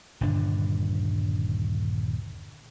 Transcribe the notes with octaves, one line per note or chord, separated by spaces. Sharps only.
D#1 G2 D3 D4